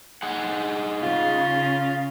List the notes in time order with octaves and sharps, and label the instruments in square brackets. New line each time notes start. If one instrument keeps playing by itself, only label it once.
[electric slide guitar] D#4 G#4 F#5
[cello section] C#3 [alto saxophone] F4